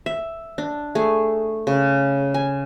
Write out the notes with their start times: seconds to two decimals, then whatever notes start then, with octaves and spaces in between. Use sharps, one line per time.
0.06 E5
0.58 D4
0.95 A3 G#4
1.67 C#3
2.34 G#5